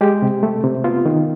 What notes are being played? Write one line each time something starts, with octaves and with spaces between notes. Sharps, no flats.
G#3 G4
C3
A3
C3
B3 F4
D#3